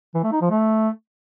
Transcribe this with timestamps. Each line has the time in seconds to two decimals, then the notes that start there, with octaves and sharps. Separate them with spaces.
0.14 E3
0.23 A3
0.32 D#4
0.41 F3
0.50 A3